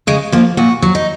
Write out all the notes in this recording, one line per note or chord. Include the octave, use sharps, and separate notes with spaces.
C#3 G#3
F3 A#3
A#2 F#4
F#3
D#4